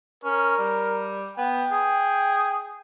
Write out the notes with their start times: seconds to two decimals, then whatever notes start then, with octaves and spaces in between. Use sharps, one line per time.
0.24 C#4 A#4
0.58 G3
1.38 B3 G5
1.71 G#4